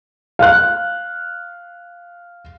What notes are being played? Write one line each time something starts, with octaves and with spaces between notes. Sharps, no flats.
F5 F#6